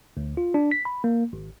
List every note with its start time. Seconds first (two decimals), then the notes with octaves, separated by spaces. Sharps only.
0.17 D2
0.37 F4
0.54 D4
0.71 B6
0.85 B5
1.04 A#3
1.33 G#1